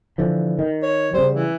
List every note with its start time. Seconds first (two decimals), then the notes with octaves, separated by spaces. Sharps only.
0.18 D3 E3 F3
0.59 D#3
0.82 C#5
1.13 C#3 G3 C5
1.32 E3